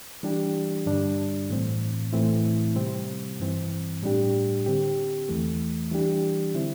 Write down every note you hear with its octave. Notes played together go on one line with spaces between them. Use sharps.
E3 G3 D4 G4
G2 D3 G3 D4
A2 E3 C4
A2 E3 A3 C4 E4
C3 G3 C4
G2 E3 C4
A2 G3 D4 G4
D3 C4 G4
E2 E3 A3
E3 G3 D4 G4
D3 C4 E4